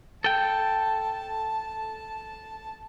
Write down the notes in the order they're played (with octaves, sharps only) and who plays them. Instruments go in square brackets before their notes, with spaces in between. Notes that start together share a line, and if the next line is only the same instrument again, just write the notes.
[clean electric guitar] A4 G5 [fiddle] A5